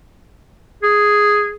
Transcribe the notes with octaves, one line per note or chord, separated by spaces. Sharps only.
G#4